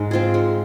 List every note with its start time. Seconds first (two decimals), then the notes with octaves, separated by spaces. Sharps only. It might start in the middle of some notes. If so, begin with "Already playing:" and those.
Already playing: G#2 G#3
0.11 C4 F4 G#4
0.34 G#3